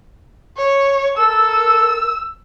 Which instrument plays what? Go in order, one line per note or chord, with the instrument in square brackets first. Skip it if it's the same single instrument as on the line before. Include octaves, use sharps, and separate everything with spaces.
[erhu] C#5
[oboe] A4 [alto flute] A#4 [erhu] E6